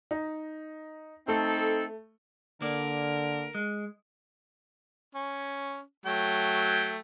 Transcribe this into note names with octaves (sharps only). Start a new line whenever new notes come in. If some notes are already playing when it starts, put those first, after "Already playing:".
D#4
A3 C4 D#4 A4
D3 A#3 A#4 D5
G#3
C#4
F#3 A3 G5